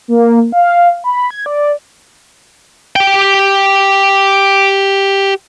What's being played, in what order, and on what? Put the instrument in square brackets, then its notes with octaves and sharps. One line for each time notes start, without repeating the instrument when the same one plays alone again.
[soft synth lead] A#3
F5
B5
G#6
D5
[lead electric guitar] G4 G5